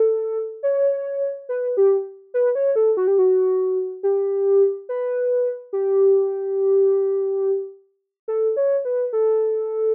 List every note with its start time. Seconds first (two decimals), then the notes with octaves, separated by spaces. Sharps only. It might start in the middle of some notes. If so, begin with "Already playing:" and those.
Already playing: A4
0.63 C#5
1.49 B4
1.77 G4
2.34 B4
2.55 C#5
2.76 A4
2.97 F#4
3.07 G4
3.19 F#4
4.03 G4
4.89 B4
5.73 G4
8.28 A4
8.56 C#5
8.85 B4
9.13 A4